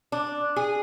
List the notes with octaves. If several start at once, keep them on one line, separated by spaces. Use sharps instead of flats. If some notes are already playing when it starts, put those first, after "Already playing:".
D4
G#4